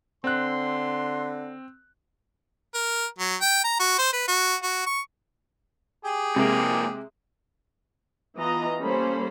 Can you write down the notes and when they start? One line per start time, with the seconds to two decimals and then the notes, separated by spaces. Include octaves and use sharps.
0.24 D3 C4 C6 F#6
2.74 A#4
3.18 F#3
3.41 G5
3.64 A#5
3.79 F#4
3.98 C5
4.13 B4
4.28 F#4
4.63 F#4
4.86 C#6
6.05 G4 G#4
6.36 F2 C3 G#3 A#3
8.38 E3 B3 F4 D#5 A#5
8.82 G3 A#3 C#4 A4 C5 B5